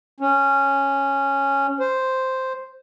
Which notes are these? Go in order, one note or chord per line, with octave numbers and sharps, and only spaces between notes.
C#4
C5